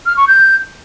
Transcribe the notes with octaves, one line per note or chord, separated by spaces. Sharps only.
F6
C#6
G6